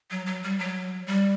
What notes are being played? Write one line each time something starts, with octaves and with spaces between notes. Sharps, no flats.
F#3
F#3
G3
F#3
G3